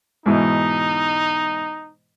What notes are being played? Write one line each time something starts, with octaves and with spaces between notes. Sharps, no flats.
G#2 B2 E3 D#4